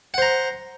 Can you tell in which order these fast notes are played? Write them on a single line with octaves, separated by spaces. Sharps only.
F#5 C5 A#5